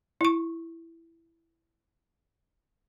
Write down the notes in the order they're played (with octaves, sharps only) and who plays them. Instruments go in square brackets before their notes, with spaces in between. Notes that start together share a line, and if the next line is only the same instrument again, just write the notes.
[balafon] E4 C#6